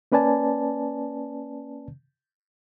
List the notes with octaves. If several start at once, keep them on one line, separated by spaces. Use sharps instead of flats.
A#3 C#4 B4 D5 G#5 A5